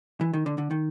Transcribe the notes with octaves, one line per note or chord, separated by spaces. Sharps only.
E3
D#3
D3
D3
D#3